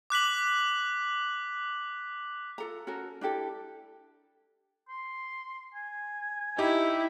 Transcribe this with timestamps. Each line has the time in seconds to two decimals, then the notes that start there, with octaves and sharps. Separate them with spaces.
0.10 D6 F#6 B6 F#7
2.58 F4 A4 A#5
2.87 C#4 F#4 A4 A#4
3.21 D4 E4 G4 A4
4.89 C6
5.74 G#5
6.58 D#4 E4 G4